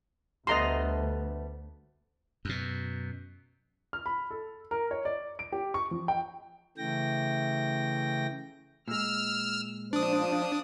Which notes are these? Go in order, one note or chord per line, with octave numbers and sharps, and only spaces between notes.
D2 G3 A3 B3 D#5 A#5 C6
F#2 B2
F6
B5
A4
A#4
C#5
D5
D7
G4
C#6
F3
G5
C#3 E3 A3 G5 A#6
A#2 G#3 E6 F6
F3 D4 C5 D#6